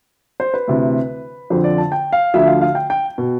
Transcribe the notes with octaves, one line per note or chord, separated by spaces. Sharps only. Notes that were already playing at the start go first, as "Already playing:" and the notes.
C5
B4
D2 C3 E3
F2 D3 F3 C5
D5
A5
G5
F5
D2 D3 F3 E5
F5
F5
G5
G5
B2